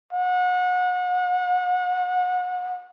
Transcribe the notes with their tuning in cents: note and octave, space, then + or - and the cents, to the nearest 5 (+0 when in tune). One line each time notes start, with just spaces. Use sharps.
F#5 -30